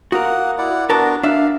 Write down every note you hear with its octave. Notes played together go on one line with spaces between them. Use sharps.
A#3 F#4 A#4 F#5 D#6
E4 D5 F#5
B3 D4 F#4 A#4 A5
D4 E5 F5